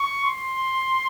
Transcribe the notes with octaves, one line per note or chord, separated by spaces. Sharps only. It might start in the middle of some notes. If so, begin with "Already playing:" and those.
Already playing: C#6
C6